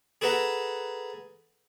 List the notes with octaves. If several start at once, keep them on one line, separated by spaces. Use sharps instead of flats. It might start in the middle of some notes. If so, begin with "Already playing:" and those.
G#4 A4 B4 F#5 A#5